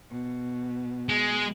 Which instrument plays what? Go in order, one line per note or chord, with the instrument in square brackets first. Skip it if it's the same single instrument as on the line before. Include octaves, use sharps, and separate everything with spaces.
[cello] B2
[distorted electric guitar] G#3